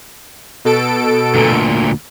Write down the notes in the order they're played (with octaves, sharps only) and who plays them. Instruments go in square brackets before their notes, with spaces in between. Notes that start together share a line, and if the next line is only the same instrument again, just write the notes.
[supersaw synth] B2 A4 D7
[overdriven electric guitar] D2 A#2